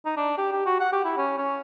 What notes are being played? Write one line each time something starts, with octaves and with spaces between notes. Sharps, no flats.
D#4
D4
G4
G4
F#4
F#5
G4
E4
C#4
C#4